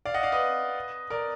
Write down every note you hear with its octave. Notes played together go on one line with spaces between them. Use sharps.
D5 F5
D#5 F#5
D5 F5
B4 D#5
A#4 D5